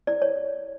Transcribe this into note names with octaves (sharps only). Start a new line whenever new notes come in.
E4 D5
C#5